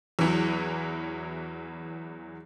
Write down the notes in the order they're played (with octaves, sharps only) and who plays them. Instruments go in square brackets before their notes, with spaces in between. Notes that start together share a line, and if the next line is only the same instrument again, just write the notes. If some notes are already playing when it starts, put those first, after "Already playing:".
[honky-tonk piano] E2 E3 F#3